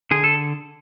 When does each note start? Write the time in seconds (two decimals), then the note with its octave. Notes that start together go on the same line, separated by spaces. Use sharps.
0.11 D3 G#4
0.24 A4